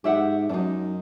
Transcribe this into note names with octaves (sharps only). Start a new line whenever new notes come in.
G#2 G4 E5 F#5
F#2 D4 D#4